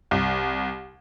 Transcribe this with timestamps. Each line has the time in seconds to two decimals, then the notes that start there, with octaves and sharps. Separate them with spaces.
0.11 C2